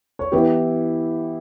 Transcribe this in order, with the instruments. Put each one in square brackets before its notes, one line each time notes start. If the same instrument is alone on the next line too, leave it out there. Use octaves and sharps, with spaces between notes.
[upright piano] C#5
[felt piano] E3 B3 E4 G4 [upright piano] B4